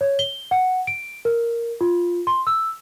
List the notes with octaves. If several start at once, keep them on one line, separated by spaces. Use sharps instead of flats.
C#5
G7
F#5
D7
A#4
F4
C6
E6